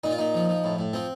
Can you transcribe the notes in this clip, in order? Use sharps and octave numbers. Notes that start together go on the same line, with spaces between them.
A#2 D#4
F4
A#2 D#4
F3
F3
A2
A2
F3 C4